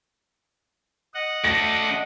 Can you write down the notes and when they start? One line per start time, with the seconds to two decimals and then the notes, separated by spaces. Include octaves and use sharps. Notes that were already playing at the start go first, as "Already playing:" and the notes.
1.14 D#5 F#5
1.44 A3 D4 A#6